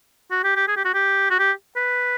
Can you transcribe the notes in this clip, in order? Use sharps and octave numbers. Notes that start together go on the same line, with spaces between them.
F#4
G4
G4
G#4
G4
F#4
G4
F#4
G4
B4